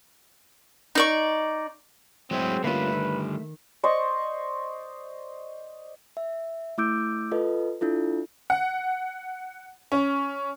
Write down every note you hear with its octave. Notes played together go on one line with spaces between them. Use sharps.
D#4 D5 C#6
F#3 G#3 A3 C4 E4 G#4
D3 G3 A3 A#3 C#4 F4 B4 E5
D#3
C5 D5 D#5 C#6
E5
A3 E4 D6 E6 G6 D7
F4 A4 B4 D#5
D4 E4 F4 A4
F#5
C#4